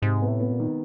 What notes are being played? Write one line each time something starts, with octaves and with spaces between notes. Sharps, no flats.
G#2 C3
B3
A2
B3
A#2
D#3